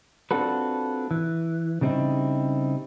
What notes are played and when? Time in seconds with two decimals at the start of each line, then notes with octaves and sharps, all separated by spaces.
0.31 C4 D4 F4 F#4 A4 B4
1.11 E3
1.81 C#3 G3 C4 D#4 E4